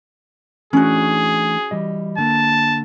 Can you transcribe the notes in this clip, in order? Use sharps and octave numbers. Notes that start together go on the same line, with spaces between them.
E3 A3 C#4 D4 F#4 G#4
E3 G3 D#5
D3 A#3 A5